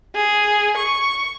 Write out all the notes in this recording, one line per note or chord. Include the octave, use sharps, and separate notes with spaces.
G#4
C#6